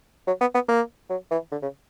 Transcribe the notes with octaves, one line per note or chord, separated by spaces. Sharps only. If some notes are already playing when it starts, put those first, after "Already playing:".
F#3
B3
B3
A#3
F#3
E3
D3
C#3